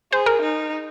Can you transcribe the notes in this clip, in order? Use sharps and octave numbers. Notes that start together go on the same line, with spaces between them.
G#4 C5
A#4
D#4